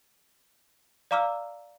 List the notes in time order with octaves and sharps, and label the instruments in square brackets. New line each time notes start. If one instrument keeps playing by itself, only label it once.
[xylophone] D5 F5 A#5 D6 E6 F6